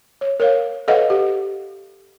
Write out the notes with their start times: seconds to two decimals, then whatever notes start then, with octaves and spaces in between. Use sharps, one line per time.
0.21 C#5
0.40 A#4 C#5 F5
0.88 A4 B4 C#5 D#5 F5 F#5
1.10 G4